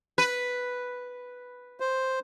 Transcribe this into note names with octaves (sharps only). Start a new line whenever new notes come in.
B4
C5